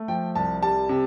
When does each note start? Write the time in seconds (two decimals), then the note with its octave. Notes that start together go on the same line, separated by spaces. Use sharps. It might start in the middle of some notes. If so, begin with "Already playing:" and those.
Already playing: A3
0.08 F3 G5
0.35 C2 A5
0.62 G3 A5
0.89 C3